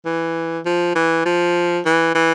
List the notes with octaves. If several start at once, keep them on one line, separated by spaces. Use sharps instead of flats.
E3
F3
E3
F3
E3
E3